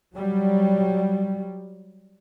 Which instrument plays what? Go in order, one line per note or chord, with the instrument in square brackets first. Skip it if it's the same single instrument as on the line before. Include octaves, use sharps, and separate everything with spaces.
[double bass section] F#3 G3